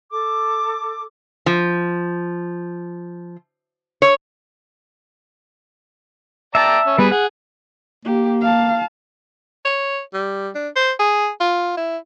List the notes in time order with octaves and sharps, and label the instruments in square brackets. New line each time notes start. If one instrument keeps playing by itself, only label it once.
[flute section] A4 D6
[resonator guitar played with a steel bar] F3
C#5
[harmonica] D5 G5 A#5 [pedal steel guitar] E5 A5
[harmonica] C#4
[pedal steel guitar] G3 B3 [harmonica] G#4 B4
[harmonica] G#4 [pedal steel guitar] F#5
[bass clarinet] A#3 [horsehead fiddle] G4
[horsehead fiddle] F5 A5
[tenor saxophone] C#5
G3
D4
C5
G#4
F4
E4